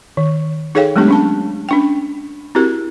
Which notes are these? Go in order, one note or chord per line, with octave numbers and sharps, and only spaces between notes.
D#3
D#4 G#4 A4 C#5 F5 G5
F#3 G#3 A3 B3 D4 G4
C#4 D4 A5
C#4 D4 G5
C4 E4 F#4 G4 A#4